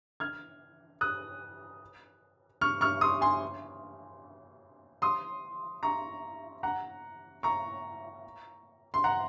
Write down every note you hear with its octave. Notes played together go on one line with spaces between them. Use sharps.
F6 G#6
D#6 F#6
C#6 F6
C#6 F6
C6 D#6
G#5 C6
C6 D#6
A#5 C#6
F#5 A#5
A#5 C#6
C6
F#5 A#5